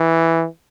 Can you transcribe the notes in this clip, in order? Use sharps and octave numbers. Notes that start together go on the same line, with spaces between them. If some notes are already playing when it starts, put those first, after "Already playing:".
Already playing: E3